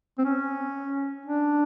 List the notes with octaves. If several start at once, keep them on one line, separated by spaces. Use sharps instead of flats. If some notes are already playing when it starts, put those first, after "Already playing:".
C4
C#4
D4